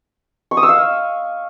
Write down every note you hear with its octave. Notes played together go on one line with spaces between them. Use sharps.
C#6
D#6
E6
F5